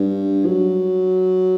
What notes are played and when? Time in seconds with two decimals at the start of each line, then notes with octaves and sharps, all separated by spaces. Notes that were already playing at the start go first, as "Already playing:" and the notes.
Already playing: G2
0.46 F#3